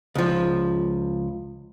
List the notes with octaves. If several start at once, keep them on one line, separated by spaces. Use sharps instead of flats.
C#2 F3